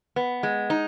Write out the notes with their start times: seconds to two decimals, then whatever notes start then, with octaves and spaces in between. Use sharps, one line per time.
0.16 B3
0.43 G#3
0.70 D#4